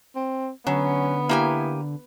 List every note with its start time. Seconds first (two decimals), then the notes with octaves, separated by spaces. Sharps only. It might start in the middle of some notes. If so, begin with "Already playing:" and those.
0.16 C4
0.67 D3 F#3 B3 C#4
1.29 A#3 E4 G4 G#5